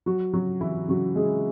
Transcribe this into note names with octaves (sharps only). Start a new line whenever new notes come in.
F#3 F#4
C#3 F#3 F#4
E3 F#3 E4
C#3 F#3 F#4
C#3 G#3 G#4